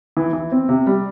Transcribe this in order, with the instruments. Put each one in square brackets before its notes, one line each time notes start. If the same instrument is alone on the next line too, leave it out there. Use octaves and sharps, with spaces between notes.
[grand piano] E3
E3
C4
C3
G3